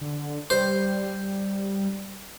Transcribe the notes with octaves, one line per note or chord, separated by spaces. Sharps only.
D3
G3 C5